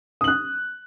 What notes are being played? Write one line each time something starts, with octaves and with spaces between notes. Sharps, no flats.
D#6 F#6 F#7